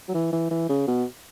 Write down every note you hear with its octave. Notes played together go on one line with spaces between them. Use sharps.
F#3
E3
E3
E3
C#3
B2